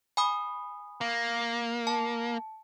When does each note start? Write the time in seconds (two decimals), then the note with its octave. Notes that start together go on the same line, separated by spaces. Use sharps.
0.17 G#5 B5 D#6
1.01 A#3
1.87 A5